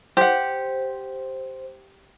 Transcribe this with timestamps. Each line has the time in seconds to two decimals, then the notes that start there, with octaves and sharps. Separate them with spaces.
0.17 G4 C5 F#5